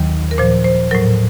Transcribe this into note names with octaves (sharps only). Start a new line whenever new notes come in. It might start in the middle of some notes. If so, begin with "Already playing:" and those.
Already playing: D#2 D#3 F#3
A#4
A#2 F3 C5
C5
A2 F#3 A#4